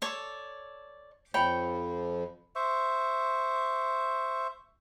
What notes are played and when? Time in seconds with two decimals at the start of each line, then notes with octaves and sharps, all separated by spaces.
0.02 A4 C#5 D5
1.34 F2 F3 C#5 G5 B5
2.55 C5 E5 C#6